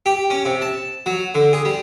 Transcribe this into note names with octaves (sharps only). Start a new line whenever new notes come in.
G4
C#4
C3
A5
F#3
D3
G#4
G3